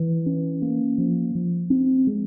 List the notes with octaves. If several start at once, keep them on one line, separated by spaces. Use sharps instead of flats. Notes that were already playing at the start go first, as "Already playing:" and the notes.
Already playing: E3
C#4
A#3
F3
F3
C4
G#3